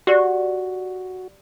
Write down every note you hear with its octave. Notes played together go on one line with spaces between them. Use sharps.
F#4 G4 D5